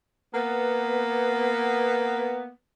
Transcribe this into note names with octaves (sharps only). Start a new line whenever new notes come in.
A#3 B3